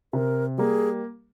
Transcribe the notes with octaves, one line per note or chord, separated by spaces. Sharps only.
C3 A#4
G3 A#3 G#4